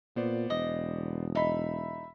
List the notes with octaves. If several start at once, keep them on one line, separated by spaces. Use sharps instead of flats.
A#2 B3 C5 D5
E1 D#5
D#4 E5 B5 B6